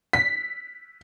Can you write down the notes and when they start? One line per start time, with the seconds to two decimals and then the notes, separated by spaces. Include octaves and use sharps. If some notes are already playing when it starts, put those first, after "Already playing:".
0.13 B6